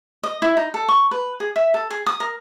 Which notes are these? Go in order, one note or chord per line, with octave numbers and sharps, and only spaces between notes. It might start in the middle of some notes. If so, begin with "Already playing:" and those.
D#5
E4
D#4
A4
C#6
B4
G#4
E5
A4
G#4
D#6
A#4